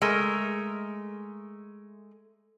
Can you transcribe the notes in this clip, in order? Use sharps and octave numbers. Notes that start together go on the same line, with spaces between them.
G#3 A3 A#4